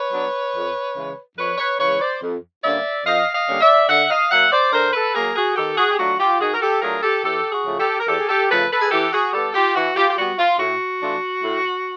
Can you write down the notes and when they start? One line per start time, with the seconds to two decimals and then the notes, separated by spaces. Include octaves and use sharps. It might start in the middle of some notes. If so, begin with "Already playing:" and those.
Already playing: B4 C#5
0.12 F#3 B3 D4
0.55 F2
0.96 C#3 E3 G#3
1.37 F2 B4 C#5
1.58 B4 C#5
1.79 C#3 E3 G#3 B4 C#5
2.00 C5 D5
2.22 F2
2.63 D3 G3 A#3 C#4 D5 E5
3.05 F2 D#5 F5
3.33 D#5 F5
3.48 D3 G3 A#3 C#4
3.61 D5 E5
3.89 D3 E5 F#5
4.10 D#5 F5
4.31 F#3 A#3 E5 F#5
4.51 C5 D5
4.73 D3 A#4 C5
4.93 A4 B4
5.14 F#3 A#3 G#4 A#4
5.36 F#4 G#4
5.56 D#3 G4 A4
5.77 F#4 G#4
5.91 G4
5.98 F#3 A3 D4 F4 F#4
6.19 F4 G4
6.40 D#3 F#4 G#4
6.54 A#4
6.61 G4 A4
6.82 F#3 A3 D4 F4 G#4 A#4
7.03 G4 A4
7.24 E2 G4 A4
7.51 F#4 G#4
7.66 C#3 F3 A3
7.80 G4 A4
8.00 A#4
8.08 E2 G4 A4
8.19 G#4
8.29 G4 A4
8.50 C#3 F3 A3 A4 B4
8.71 A4 B4
8.81 G#4
8.91 E3 G4 A4
9.13 F#4 G#4
9.33 G3 B3 G4 A4
9.54 F4 G4
9.75 E3 F#4
9.96 F4 G4
10.10 G4
10.17 G3 B3 F#4
10.38 F4
10.59 A2 F#4
11.01 E3 A3 D4 F4
11.43 A2